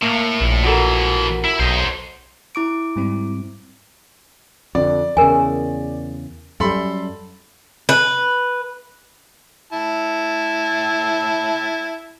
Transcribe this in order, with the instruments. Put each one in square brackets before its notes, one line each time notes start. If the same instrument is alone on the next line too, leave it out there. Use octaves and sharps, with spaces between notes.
[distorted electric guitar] A2 [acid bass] A#3
[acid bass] A#1
[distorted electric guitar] B2 E3 [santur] F#4 A4 A#4
[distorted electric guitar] E4
[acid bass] B1 [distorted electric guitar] C5 D#5
[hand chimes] E4 D6 D7
[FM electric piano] G#2 G3 C4
[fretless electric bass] F2 D3 [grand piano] D5
[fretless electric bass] E2 C#3 [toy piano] A#4 G#5
[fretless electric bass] F#2 G3 [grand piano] A4 B5 C6
[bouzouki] B4
[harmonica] E4 A5